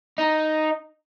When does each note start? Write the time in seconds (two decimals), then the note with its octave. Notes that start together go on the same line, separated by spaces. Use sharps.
0.18 D#4